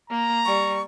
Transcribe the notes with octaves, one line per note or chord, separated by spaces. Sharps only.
A#3 A#5
G3 C#6